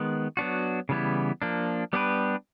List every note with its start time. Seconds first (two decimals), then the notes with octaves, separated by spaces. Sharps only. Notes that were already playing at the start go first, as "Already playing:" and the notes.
Already playing: D#3 G#3 B3
0.37 F#3 B3 D4 F#4
0.89 C#3 E3 G3 B3 E4
1.42 F3 A#3 D4
1.93 G3 B3 D4 G4 B4